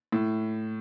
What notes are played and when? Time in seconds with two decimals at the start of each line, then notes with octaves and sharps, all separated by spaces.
0.12 A2